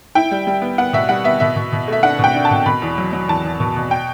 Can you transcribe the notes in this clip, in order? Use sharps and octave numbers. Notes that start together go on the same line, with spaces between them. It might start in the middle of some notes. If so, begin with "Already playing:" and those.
E4 G5
G3
G3
B3
B3 F#5
B2 E5
G3 F#5
B3 E5
B2 E5
B2
B2
A3 E5
D4 F#5
B2
G5
D4
A5
B2
B2 B5
E2
F#3
F#3
E2 A5
E2
B2
B2
G5